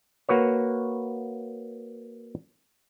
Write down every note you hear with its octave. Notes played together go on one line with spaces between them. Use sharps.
A#3 F#4 B4 C#5